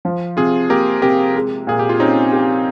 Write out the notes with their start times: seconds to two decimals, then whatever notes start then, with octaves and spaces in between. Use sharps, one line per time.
0.05 F3
0.37 C3 F4 G#4
0.70 A#3 G4 A#4
1.02 C3 G4 A#4
1.35 G#3
1.67 A#2 G#4
1.79 G4
1.89 F4
2.00 C4 C#4 D#4
2.32 G4